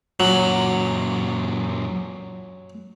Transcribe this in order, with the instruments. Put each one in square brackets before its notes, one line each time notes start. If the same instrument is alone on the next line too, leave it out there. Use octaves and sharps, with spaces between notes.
[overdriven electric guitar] F#2 A#2 [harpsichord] F#3